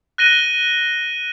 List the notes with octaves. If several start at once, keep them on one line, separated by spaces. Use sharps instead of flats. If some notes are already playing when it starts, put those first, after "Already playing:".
F#6 A#6 D#7 G7